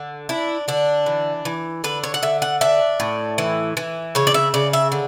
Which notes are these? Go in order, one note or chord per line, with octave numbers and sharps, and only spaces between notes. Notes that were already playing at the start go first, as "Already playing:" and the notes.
Already playing: D3
D4 E4
D3 D4
E3
E3
D3 B4
C#5
F#5
D3 E5
F#5
D4 E5
A2
E3
E3
C#3 C#5
D5
E5
C#3 D5
E5
D3